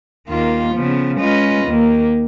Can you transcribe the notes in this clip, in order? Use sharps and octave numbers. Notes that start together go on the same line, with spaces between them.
D#2 D#3 A#3 F4
C#3 F3 B3
G#3 C#4 F4 B4 D#5
D#2 D#3 A#3